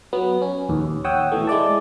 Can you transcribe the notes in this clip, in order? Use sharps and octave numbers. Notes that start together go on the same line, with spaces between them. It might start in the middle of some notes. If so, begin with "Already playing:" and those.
F#3 B3
C#4
A#1 D#2
C#5 F#5 G5 D#6 E6
B2 E3 A3
G#3 E4 D5 A5